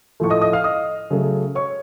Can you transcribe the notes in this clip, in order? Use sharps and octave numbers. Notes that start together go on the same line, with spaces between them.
A2 F3 A3 C#6
D#5 D#6
D#5 D#6
F5 F6
D#5 D#6
C#3 F#3 A3
C#5 C#6